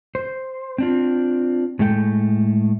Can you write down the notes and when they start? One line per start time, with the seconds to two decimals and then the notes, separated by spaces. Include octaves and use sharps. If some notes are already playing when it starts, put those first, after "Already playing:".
0.15 C5
0.78 C4 D4 F4
1.79 A2 G#3 A3 A4 G5